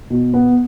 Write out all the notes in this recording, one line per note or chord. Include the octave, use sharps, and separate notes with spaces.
B2
B3